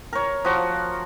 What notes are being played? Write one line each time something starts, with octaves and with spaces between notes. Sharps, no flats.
A#4 C#5
F3 F#4